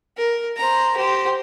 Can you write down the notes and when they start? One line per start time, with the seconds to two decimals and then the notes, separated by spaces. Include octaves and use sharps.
0.17 A#4
0.57 C5 A#5
0.96 G4 C5